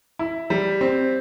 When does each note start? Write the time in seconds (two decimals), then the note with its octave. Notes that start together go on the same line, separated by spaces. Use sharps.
0.19 E4
0.50 G3
0.81 C4